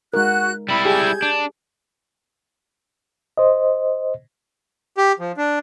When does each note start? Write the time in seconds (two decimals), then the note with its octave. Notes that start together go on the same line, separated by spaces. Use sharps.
0.14 G#3 D#4 F#4 A#4 F#6
0.69 G3 E4 B5
0.85 G4 G#4 G6 G#6
1.22 D4
3.38 C5 D#5
4.97 G4
5.19 F3
5.37 D4